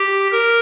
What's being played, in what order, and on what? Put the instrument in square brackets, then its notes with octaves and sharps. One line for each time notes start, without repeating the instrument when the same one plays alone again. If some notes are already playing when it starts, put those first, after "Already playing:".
Already playing: [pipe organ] G4
A#4